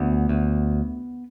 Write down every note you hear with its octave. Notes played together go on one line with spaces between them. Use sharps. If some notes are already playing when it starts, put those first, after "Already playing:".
Already playing: D2 B3
D2